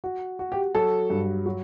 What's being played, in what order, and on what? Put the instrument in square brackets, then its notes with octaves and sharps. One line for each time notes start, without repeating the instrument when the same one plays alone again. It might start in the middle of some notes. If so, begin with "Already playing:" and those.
[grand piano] F#4
F#4
[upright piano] G4
[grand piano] F#3 [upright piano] A4
[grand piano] G2
F#3